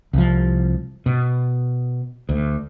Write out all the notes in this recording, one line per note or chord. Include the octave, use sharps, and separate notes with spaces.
C2 F3
B2
D2